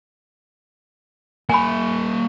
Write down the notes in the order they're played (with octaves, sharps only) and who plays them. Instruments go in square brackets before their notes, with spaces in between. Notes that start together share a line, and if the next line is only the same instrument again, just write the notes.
[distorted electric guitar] A#3 E5 [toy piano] G#5 B5